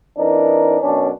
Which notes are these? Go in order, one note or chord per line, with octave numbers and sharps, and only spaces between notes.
E3 C4 D4 D#4 A#4
F#2 B2 C#4 D4